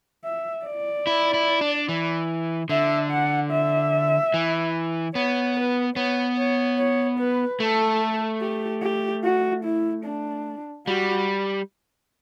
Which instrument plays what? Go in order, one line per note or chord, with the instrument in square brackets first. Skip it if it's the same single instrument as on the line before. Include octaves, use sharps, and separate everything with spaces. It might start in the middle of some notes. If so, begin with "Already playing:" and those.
[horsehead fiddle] E5
D5
[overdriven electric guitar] E4
E4
D4
E3
[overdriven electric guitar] D3 [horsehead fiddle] E5
[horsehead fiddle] F#5
E5
[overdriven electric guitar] E3
[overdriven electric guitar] B3 [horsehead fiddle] C#5
[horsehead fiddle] B4
[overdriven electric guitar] B3 [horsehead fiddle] C#5
[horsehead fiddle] C#5
C#5
B4
[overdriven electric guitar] A3 [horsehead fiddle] A4
[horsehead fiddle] G4
G4
F#4
E4
D4
[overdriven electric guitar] G3 [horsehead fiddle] F#4